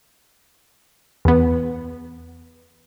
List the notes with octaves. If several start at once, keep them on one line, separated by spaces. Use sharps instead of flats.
E2 B3